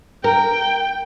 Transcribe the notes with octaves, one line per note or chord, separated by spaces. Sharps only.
A#4 G5